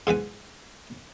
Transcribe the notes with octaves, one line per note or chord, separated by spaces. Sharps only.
G#2 E3 B4 G#5